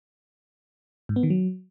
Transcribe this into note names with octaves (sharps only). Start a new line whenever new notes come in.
G#2
B3
D#3
F#3